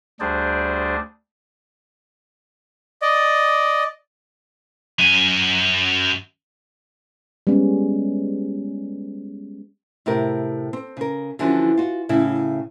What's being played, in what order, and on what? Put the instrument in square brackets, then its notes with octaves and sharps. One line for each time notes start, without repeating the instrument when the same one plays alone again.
[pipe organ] D2 G3 D4 G#4 C5 D5
[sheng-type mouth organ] D5 D#5
[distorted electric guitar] F#2 G#5
[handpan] G3 G#3 B3 C#4
[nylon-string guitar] A2 C3 G4 A#4
C4
C#3 A#4
D3 E3 F3 C#4 F#4
F4 F#4
A2 C#3 E4